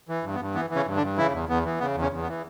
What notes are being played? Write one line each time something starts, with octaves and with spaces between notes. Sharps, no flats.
E3
G2
B3
G2
E3 B3
E3
C#3 C#4
G2
D3 D4
G2
C#3 E3 E4
E2
E2 B3
E3
C#3 B3
E2
C#3 C#4
E2
B3
E3